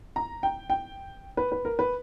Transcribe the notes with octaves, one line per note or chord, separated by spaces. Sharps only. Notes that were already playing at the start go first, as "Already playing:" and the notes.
A#5
G5
G5
B4
B4
A#4
B4